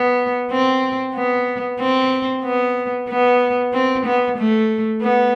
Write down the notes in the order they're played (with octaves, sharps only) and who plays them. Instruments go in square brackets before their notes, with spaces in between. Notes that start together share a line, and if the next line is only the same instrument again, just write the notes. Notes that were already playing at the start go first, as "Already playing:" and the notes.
Already playing: [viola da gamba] B3
C4
B3
C4
B3
B3
C4
B3
A3
B3